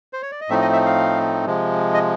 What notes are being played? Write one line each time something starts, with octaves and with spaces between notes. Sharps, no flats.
C5
C#5
D5
D#5
A2 F3 A3 C4 D#4 E5
D#5
E5
F5
C3 F3 G#3
D#5